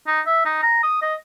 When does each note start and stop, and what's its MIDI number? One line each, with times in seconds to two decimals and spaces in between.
0.07 0.21 63
0.26 0.44 76
0.45 0.59 63
0.63 0.79 82
0.83 0.97 87
1.02 1.15 75